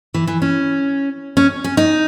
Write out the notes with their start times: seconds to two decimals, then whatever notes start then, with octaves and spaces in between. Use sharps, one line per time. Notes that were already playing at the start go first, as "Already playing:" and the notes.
0.14 E3
0.27 E3
0.42 C#4
1.37 C#4
1.64 C#4
1.77 D#4